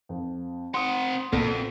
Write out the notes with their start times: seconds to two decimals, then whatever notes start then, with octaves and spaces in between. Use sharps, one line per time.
0.09 F2
0.74 C4 F#5 C6 D#6
1.33 F2 A#2 C#3 A#3 B3 A4